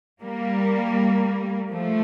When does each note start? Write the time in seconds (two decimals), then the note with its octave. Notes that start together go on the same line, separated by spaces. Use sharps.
0.22 G3 A#3
1.71 F3 A3